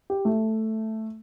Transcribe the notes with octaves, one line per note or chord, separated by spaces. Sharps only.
G4
A3